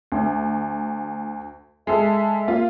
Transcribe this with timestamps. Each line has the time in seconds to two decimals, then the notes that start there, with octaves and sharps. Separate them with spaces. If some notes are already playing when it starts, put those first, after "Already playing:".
0.12 D2
1.87 G#3 A4 E5
2.48 A#3 F4